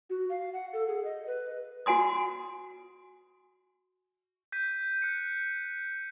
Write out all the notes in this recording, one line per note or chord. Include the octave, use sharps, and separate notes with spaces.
F#4
F5
F#5
A4
G#4
D#5
B4
F#4 F#5 G#5 C6 D#6
G6 B6 D#7
F#6 C#7